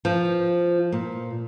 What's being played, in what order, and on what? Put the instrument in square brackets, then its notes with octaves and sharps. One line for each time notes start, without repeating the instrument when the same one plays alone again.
[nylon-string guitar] F3
A#2